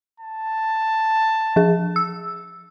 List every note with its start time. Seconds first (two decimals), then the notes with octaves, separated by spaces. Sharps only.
0.20 A5
1.56 F3 G#4
1.96 E6